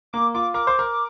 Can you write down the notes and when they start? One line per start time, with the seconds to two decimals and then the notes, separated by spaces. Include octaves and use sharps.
0.13 A#3 D6
0.34 F4 D6
0.54 A#4 D6
0.67 C5
0.79 A#4